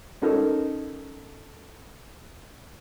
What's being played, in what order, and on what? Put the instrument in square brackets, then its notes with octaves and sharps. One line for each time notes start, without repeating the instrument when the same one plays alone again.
[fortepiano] C#4 D#4 A4 A#4 D#5